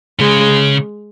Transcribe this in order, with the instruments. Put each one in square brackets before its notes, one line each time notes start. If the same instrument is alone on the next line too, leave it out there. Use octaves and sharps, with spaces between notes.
[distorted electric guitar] C#3 [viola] G#3